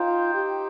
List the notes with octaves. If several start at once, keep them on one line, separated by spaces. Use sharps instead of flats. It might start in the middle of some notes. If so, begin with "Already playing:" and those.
Already playing: D#4 F4 C5 G5
G4